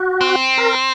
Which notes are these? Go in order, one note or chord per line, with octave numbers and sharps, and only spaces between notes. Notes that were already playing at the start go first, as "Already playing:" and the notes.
Already playing: F#4
C4
A#4